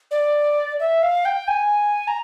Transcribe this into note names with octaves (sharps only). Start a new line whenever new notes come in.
D5
E5
F5
G5
G#5
A#5